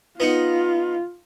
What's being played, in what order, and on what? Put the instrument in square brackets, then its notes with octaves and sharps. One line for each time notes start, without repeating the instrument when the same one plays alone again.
[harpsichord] B3 D#4 F#5 [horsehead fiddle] F4